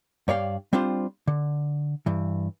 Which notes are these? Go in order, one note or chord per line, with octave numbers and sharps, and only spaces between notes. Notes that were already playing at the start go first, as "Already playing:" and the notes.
G2 C#5 D5 F5 G5
G3 C4 D4 F4 C5
D3
G2 E3